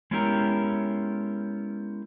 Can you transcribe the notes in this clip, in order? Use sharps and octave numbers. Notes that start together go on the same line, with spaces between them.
G#3 B3 C#4 E4 G4 A#4